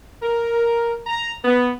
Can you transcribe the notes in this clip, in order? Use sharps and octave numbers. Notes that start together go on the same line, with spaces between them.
A#4
A#5
B3